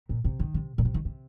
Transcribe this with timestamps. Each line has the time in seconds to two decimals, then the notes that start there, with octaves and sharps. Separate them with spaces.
0.09 A#2
0.24 C3
0.40 D#3
0.54 C3
0.78 A#2
0.85 C3
0.94 D#3
1.05 C3